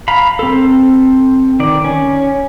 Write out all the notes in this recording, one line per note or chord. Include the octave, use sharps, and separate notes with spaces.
F5 A#5 B5
C4 A4
D#3 D5
C#4